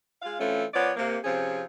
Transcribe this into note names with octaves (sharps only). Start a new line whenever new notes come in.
G#3 F4 F5
E3 A3 C4 C#4 F4
F3 B3 C#5 D5
C3 A#3
C3 F3 C4 C#4 G#4